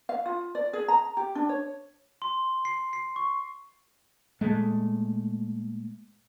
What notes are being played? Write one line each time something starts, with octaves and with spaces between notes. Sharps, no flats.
F5
F4
D5
G#4
A#5
G4
D4
C#5
C6
C7
C7
C#6
A#2 G#3 A3